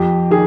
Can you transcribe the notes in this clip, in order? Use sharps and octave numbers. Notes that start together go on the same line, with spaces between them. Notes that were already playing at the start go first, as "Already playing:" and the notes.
Already playing: F2 G4
D#3 G#4